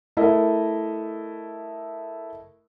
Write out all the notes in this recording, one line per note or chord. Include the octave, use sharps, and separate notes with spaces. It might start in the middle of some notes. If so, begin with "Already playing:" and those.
A3 E4 A#4 D#5 E5